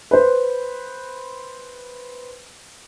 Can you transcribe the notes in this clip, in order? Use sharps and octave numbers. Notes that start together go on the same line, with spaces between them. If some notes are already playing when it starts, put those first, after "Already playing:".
B4 C5